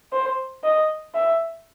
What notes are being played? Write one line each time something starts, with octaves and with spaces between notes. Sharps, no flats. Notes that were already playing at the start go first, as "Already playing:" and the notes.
C5
D#5
E5